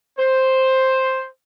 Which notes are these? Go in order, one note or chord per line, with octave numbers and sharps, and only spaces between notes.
C5